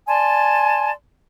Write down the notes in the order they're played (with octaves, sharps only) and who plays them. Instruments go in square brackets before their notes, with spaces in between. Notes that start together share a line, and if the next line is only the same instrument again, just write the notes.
[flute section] D5 G#5 A5 C6